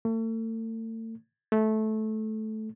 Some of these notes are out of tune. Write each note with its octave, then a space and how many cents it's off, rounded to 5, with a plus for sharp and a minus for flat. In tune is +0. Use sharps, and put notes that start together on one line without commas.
A3 +40
A3 -15